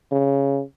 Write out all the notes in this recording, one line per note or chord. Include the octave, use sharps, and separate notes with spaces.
C#3